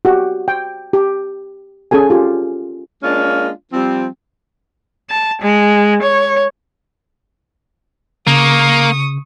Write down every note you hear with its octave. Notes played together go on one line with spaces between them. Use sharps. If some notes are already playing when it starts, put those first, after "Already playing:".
F#4 G4
G5
G4
C#4 G#4 A4 G#5
F4 G4
G#3 A#3 C#4 D4 F4
F3 G3 C4
A5
G#3
C#5
C#3 A#3 C#6 D#6